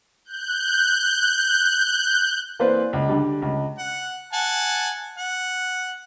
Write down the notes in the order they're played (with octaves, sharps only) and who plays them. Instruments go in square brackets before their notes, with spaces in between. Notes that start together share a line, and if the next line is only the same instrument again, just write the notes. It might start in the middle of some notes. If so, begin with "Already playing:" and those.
[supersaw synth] F#6 G6
[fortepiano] E3 A#3 C4 B4 C5 D5
C#2
D3 G3
C#2
[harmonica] F#5
F#5 G#5 A5
F#5